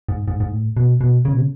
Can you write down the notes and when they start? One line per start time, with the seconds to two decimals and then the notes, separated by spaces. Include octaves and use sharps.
0.09 G#2
0.28 G#2
0.40 G#2
0.52 A2
0.77 B2
1.01 B2
1.25 C#3
1.33 B2
1.40 C#3